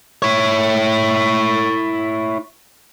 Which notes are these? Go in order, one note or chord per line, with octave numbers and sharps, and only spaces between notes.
E4 C#5